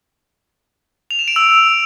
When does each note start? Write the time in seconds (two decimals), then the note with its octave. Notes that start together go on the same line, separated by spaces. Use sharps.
1.11 F7
1.19 E7
1.28 D7
1.36 E6